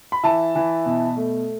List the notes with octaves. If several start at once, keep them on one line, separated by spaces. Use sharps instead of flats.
B5
E3 E5 A5
E3
B2
A3